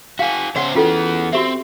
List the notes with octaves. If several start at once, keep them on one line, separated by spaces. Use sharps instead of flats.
F#4 G#4 F5
C#3 C5 C#5 F#5
E3 B3 C#4 F4 A4
C4 F#4 G4 E5